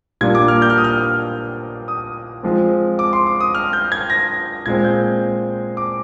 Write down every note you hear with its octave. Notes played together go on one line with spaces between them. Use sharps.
A#2 G3 A#3 D4 G#6
D6
F6
G6
F6
D#6
F6
D#6
F3 G#3 C4
D6
C6
D6
D#6
F6
G6
G#6
A#6
A#2 G#3 C4 G#6
G6
D6